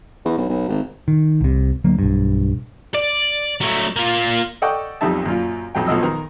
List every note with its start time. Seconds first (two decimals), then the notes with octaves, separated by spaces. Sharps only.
0.25 E2
0.38 B1
0.49 B1
0.68 G#1
1.08 D#3
1.41 C2 C3
1.84 D2 F#3 A#3
1.99 B1 G2
2.94 D5
3.61 F#3 A3
3.97 A#3 F4
4.62 A4 D5 D#5 F#5 G5 C#6
5.01 B1 F2 G3 D#4 E5 A5
5.26 F#2 A#2 F4
5.75 B1 F2 F#3 G5
5.87 B1 B2 F3 F#3 D#5 E6
6.03 D#3 A#4